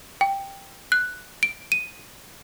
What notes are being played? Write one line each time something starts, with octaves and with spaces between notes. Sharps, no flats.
G5
F#6
D7
D#7